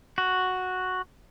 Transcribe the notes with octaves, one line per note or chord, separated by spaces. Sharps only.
F#4